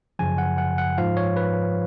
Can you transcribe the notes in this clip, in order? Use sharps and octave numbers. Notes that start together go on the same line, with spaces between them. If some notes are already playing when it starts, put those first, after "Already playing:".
F#2 C#3 F3 G#5
F#5
F#5
F#5
G#2 F3 F5
C#5
B4